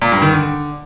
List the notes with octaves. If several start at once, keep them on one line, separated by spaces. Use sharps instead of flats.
A#2
G2
D#3
D3